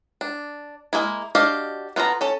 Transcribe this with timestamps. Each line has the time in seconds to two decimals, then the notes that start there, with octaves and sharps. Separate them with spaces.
0.21 D4
0.93 G#3 A#3 E4
1.35 D4 F#4 G4 D#5 F5
1.96 B3 F4 A4 A#5
2.21 C#4 A4